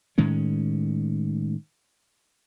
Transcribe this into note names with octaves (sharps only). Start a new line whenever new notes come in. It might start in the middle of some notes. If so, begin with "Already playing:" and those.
A2 D#3 G#3 C#4